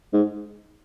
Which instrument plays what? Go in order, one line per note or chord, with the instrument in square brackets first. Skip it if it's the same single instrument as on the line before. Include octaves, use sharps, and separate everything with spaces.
[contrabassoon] G#2